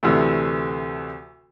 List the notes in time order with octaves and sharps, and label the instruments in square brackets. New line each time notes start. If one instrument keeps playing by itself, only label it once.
[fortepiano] D2 C3 E3 A3